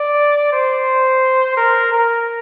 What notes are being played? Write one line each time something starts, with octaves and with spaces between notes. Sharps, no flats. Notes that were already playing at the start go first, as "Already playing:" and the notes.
Already playing: D5
C5
A#4
A#4